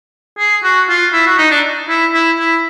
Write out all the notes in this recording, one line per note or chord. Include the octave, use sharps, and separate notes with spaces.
G#4
F#4
F4
E4
F#4
D#4
D4
E4
E4
E4